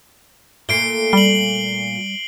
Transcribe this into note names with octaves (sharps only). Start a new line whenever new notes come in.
A#2 A3 C7 D7 G7
G3 F#7 G7